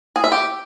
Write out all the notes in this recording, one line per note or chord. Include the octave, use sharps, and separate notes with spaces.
G#4
E5
G4